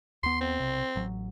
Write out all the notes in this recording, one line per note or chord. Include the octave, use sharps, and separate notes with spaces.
D#2 B3 C6
C4
B1 C3
A1 F#3